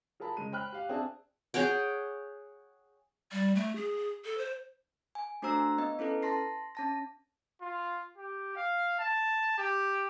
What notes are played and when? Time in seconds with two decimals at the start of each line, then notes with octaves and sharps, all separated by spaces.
0.20 F4 G#4 A#4 A5 B5
0.37 C#3 G#3 D#7
0.52 C5 G5 B5 F6 F#6
0.72 G4 F5
0.89 C4 D4 G#4 E5 A5
1.54 G#4 C#5 F#5 G5
3.32 G3
3.55 A3
3.76 G#4
4.25 A4
4.38 C5
5.15 G#5
5.42 A3 D4 F#4 C5 A#5 E6
5.78 B3 D#5
5.99 C#4 E4 A4 B4
6.22 A5 C6 A#6 C7
6.75 C#4 A5 A#6
7.62 F4
8.18 G4
8.56 F5
9.00 A5
9.58 G4